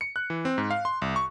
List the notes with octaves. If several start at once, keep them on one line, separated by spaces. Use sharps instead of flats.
C#7
F#6
E3
C4
G#2
F5
C6
C2
C#6